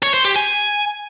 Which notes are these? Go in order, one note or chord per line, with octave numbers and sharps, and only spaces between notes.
C#5
C5
G4
G#5